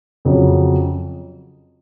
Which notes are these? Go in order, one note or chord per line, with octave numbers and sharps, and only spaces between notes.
F2 C#3 F#3